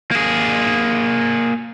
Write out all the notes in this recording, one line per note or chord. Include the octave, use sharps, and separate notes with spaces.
A#3 G#4